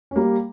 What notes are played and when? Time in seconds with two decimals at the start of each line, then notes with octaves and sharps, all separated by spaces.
0.11 C#4
0.16 G3 A#3